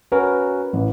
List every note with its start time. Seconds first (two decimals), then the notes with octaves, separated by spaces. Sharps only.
0.12 C#4 F#4 A#4 B4
0.73 A1